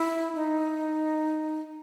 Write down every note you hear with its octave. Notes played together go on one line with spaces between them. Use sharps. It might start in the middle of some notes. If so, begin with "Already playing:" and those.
Already playing: E4
D#4